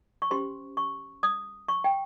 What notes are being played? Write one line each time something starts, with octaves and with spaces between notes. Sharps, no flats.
C#6
C#4 G4 C5 C6
C#6
D#6
C#6
G5